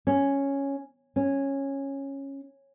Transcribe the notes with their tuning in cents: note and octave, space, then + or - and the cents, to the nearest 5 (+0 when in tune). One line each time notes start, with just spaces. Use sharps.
C#4 +0
C#4 -10